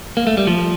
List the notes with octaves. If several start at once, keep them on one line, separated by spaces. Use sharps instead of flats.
A#3
A3
G3
F3